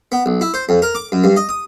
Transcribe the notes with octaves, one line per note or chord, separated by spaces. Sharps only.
B3
B1
E4
C5
F2
A#4
D6
F#2
G2
D#5
D#6